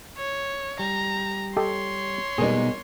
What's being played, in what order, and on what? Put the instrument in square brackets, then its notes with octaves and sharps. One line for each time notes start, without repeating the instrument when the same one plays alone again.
[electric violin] C#5
[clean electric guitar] G3 [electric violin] A#5
[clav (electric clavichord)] G4 A4 D#5 [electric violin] C#5 C6
[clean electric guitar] B2 G#3 D#4 [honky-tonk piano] G3 A#3 B3 [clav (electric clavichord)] G#4